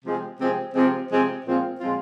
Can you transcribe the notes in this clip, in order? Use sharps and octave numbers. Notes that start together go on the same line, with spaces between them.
C3 F3 G#3 C4
C3 F3 G#3 C4
C3 F3 G#3 C4
C3 F3 G#3 C4
A#2 F3 G#3 C4 F4
A#2 F3 G#3 C4 F4